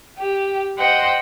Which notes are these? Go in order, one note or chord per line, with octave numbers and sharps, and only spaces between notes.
G4
C5 D#5 F#5 G5